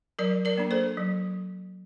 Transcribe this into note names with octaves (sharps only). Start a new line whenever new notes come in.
F#3 A#4 D5
A#4 D5
A#3 D4
A4 C5
F#3